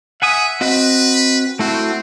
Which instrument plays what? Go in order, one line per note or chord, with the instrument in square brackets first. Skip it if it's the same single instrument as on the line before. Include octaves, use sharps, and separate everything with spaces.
[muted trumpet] E5 [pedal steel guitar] F#5 G#5 D#6
[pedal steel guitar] C4 F#4 D#5 [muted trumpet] B4
[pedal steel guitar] A3 E4 F#4 [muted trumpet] C4